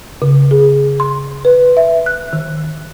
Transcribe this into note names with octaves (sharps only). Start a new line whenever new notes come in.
C#3
G#4
C6
B4
E5
F#6
D#3